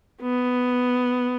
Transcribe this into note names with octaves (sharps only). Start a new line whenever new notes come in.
B3